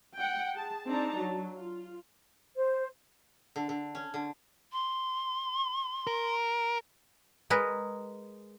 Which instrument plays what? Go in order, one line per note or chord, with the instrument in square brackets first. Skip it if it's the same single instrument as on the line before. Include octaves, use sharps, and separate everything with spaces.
[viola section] F#5 G5
G#4 A5
C4 D4 D#4 A5 A#5
F#3
F4
[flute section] C5
[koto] D3
D3
C#4
D3
[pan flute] C6
[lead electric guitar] A#4
[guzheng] G#3 G#4 A#4 B4